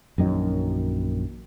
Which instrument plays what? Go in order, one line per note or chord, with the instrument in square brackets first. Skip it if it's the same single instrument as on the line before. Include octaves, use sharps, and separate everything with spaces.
[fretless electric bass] A#1 F#2 D#3 F#3